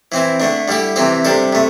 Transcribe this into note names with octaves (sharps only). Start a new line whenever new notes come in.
E3 C4 E4
D3 A3 D4
D3 G3 E4 G4
C3 E3 C4 G4
C3 G3 D4 A4
C3 A3